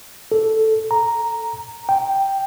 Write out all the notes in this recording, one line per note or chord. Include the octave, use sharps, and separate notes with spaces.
A4
A#5
G5